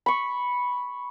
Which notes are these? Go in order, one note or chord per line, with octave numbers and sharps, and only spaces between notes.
B5 C#6